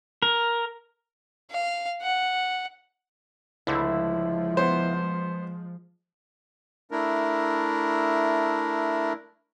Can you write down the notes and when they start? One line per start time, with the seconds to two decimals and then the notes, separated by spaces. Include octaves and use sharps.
0.22 A#4
1.51 F5
2.02 F#5
3.67 C#2 D3 F3 G#3 A3 E4
4.57 B3 C5
6.91 A3 D4 E4 A#4